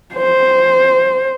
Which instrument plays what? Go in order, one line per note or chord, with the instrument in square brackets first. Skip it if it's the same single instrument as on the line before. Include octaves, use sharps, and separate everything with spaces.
[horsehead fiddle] C5